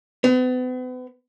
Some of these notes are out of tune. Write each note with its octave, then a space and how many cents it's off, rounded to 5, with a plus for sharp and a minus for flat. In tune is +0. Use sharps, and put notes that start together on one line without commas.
B3 +40